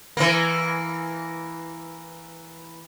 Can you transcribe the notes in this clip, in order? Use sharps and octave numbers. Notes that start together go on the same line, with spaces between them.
E3 A#3